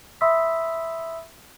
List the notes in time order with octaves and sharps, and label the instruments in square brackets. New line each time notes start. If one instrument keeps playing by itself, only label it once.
[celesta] E5 B5 C6 D#6 E6 B6